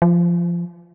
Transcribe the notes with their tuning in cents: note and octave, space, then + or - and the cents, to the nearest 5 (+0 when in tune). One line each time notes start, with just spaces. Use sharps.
F3 -15